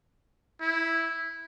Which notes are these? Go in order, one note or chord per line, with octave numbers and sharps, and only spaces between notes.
E4